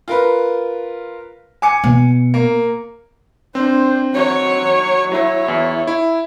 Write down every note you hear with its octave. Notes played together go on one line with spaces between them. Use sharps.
F4 A#4 B4
G#5 D6 C#7
B2
A#3
C4 D4 C5
F#3 C#5
F#3 E4 C#5
E2
E4